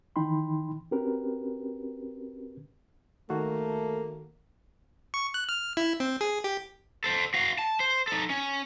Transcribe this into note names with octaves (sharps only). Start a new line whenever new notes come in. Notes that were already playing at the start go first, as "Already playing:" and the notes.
D#3 E3 D#4 G5 B5 C6
C4 C#4 F#4 G4 A#4 B4
D#3 A3 A#3 F#4 A4
C#6
F#6
F6
E4
C4
G#4
G4
A4 C5
F#4 F5
A5
C5
D#4 A4
C#4